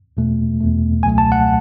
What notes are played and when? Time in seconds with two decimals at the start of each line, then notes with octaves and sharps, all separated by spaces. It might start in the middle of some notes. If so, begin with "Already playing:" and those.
0.17 E2 B2 A3
0.61 E2 B2 A3
1.03 C#2 B2 F#3 A3 G#5
1.18 A5
1.32 F#5